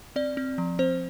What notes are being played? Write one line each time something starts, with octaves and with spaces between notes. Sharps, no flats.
C4 D5
C4
F3
C4 C5